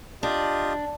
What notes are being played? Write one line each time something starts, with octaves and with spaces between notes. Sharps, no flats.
D4 F4 G4 D#5